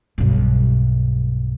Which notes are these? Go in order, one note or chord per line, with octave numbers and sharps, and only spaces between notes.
B1 G2